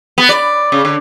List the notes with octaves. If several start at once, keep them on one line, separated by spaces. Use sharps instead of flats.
B3
D5
C#3
D3